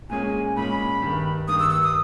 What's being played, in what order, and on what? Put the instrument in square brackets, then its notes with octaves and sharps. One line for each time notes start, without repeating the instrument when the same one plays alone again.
[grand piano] A#2 G#3 C#4 G#4 [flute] G#5
[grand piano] A#2 G#3 C#4 G#4 [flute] B5
[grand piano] G2 D#3 G3
[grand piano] G2 D#3 G3 [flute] D#6
[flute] E6
E6
D#6